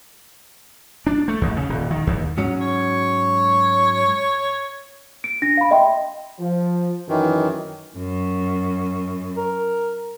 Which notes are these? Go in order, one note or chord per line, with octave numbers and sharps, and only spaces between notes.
D4
A3
D#2
C#3
D#1
D#3
D#2
G#2 F#3 C#4
C#5
D7
D4 A#6
F5 B5
D#5 E5 G5 C6
F3
F#2 D#3 E3
F#2
A#4